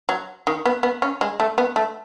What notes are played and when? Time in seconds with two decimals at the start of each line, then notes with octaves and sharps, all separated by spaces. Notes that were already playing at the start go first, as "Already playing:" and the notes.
0.09 F#3
0.47 D#3
0.66 B3
0.83 B3
1.02 C#4
1.21 G#3
1.40 A3
1.58 B3
1.76 A3